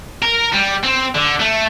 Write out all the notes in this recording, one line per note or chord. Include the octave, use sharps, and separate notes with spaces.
A#4
G3
C4
D3
A3